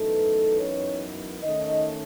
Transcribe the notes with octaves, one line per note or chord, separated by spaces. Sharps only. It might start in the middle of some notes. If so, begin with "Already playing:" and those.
Already playing: F#2 E3 A3 B3 D#4 A4
C#4 C#5
D#3 A3 C#4 D#4 D#5